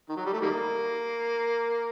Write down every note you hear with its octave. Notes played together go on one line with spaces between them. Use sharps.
D#3
F#3
G3
A3
D#3 G3 A#3